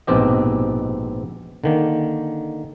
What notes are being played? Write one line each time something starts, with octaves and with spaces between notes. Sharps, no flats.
A#1 G#2 B2 C4 G4 D#5
D3 D#3 A#3